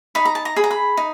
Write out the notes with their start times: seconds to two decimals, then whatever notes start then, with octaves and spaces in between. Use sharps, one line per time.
0.15 D#4 B5
0.25 A#5
0.35 A5
0.45 A#5
0.56 G#4 B5
0.64 A#5
0.71 B5
0.97 D#4